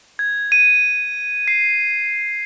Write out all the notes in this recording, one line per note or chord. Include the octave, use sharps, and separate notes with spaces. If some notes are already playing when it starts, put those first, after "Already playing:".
G#6
D#7
C7